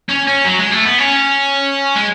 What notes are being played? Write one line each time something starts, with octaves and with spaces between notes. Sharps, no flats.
C#4
C#4
F#3
G#3
A3
B3
C#4
G#3